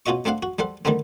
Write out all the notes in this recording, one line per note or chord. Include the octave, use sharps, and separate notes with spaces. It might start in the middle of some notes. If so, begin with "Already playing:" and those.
B2 C#4 F4 F#4 D#5 C#6
A3 C4 D4 F5 F#5
F#4
G3 A4 C5 F#5
D3 D#3 G3 A3 B3 C4